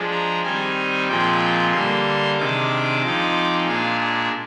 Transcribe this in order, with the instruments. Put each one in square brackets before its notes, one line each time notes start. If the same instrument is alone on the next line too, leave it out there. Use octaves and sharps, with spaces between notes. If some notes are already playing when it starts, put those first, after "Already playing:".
Already playing: [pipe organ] F3 G#3 D4
A#5
D#3 G3 C4 D#4 G#5
A#2 F3 G#3 C4 G5
D3 G3 A#3 C6
C3 D#3 G#3 D4 D6
F3 G#3 C4 D#4
A#2 G#3 D4 F5
G#4